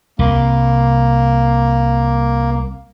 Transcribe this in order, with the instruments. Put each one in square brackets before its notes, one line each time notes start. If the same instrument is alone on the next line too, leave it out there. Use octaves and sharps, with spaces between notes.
[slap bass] C2 [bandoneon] A#3